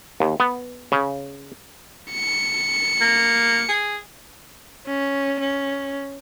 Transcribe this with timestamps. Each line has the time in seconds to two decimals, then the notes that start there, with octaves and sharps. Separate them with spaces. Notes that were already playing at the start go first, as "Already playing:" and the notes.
0.20 D#2
0.40 B3
0.92 C#3
2.13 C#7
3.01 A#3
3.69 G#4
4.86 C#4
5.40 C#4